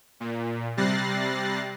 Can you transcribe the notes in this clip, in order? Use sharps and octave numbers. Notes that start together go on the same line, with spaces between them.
A#2
C3 G3 F#6 A6 A#6 C7